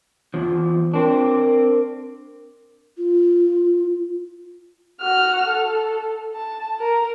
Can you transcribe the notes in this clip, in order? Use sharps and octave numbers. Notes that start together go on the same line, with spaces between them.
E2 F3 F4
C4 D4 A#4
F4
F#4 F6
A4
A5
A#4